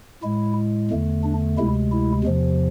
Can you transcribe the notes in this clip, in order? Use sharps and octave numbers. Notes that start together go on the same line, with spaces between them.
A2 G#3 E4
E2 D3 A3
D4
D2 C3 G#3 E4
E4
E2 C3 F3